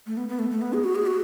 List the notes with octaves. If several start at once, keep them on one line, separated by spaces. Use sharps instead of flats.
A3
B3
B3
A3
A3
B3
G#4
F#4
G#4
F#4